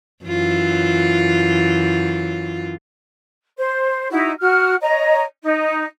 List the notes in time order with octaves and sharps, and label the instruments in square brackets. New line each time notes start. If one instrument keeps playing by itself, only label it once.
[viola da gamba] F#2 E3 F4
[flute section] C5
D#4 E4 F#4
F#4 F6
C#5 D#5 A#5
D#4